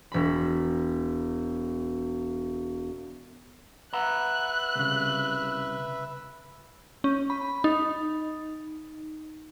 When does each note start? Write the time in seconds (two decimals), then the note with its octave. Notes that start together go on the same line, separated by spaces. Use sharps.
0.12 E1 B5
3.93 B4 E5 F#5 A#5 B5 F#6
4.75 C2 C#3
7.04 C#4
7.30 B5
7.64 D#4